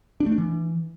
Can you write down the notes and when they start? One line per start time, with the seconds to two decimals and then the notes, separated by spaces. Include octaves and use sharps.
0.20 D4
0.26 A3
0.32 D4
0.38 E3